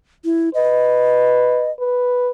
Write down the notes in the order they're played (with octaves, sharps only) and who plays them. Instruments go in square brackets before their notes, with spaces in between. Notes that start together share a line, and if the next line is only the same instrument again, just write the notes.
[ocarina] E4
[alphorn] B4 [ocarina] D#5
[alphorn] B4